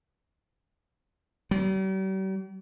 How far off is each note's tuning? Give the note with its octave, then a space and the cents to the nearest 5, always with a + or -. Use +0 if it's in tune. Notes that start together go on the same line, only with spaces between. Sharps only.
G3 -45